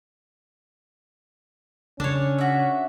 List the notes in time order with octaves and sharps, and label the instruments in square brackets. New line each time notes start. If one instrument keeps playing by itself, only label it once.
[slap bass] C#3 [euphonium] C#4 [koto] D4 C#5
[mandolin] F#4 E5